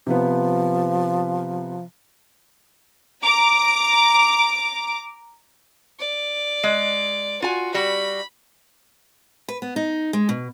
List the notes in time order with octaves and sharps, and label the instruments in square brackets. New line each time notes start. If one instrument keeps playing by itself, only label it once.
[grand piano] C3 B3 [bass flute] F3
[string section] A#5 D6
[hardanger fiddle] D5
[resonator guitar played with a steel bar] G#3
[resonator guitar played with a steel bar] F4 G#5 [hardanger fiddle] F#4
[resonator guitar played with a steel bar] G3 F#4 [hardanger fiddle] B5
[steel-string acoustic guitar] B4
B3
D#4
G#3
B2